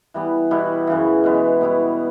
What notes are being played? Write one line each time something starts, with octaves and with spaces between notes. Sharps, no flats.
E3 G3 B3
B2 G3 B3 E4
F#2 C#3 E3
B2 G#3 B3
B2 G3 B3 E4